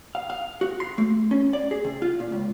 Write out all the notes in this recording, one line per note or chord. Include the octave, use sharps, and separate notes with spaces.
F5
F5
F#4
C6
A3
C#4
D5
G#4
C3
F4
A#2
C#2